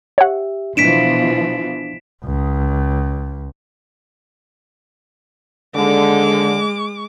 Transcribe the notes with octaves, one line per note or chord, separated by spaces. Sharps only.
G4 C#5 E5 F#5
B2 E3 F3 D4 B6 D7 E7
C#2
D#2 D3 G#3 D6